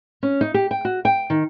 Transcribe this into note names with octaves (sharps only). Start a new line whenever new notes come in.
C#4
D#4
G4
G5
F#4
G5
D#3